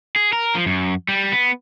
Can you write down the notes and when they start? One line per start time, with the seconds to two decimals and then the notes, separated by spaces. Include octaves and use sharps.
0.16 G#4
0.33 A#4
0.55 F3
0.66 F#2
1.08 G3
1.32 B3